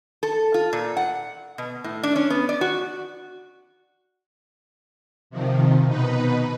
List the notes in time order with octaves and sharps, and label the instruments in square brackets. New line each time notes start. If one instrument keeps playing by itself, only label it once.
[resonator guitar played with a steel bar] A4
F4
A#2
F#5
B2
A2
D4
C#4
B3
D5
F#4
[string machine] C3 D#3 F3
B2 D#4 B4